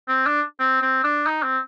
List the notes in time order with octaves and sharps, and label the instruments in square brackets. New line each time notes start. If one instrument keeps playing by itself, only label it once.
[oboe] C4
D4
C4
C4
D4
D#4
C4